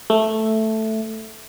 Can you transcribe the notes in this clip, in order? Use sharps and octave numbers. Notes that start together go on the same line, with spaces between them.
A3